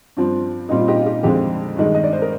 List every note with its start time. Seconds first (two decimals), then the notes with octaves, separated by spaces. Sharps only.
0.17 G2 F3 C4
0.69 A#2 G3 C4 D#4
0.79 F4
0.88 D#4 G4
1.01 F4
1.06 D#4 G4
1.23 F2 D3 G#3 C4 D#4 G4
1.77 G2 D#3 G#3
1.95 D#5
2.04 D5
2.13 C5
2.22 A#4